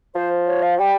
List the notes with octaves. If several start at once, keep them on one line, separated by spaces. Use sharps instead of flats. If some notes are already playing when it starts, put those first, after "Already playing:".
F3 C5
C#5
F5
G3 G5